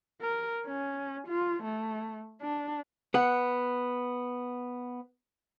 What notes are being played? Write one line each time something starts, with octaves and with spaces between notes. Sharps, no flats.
A#4
C#4
F4
A3
D4
B3 F#5